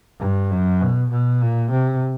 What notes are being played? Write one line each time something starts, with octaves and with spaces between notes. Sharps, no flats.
G2
F#2
B2
B2
A#2
C3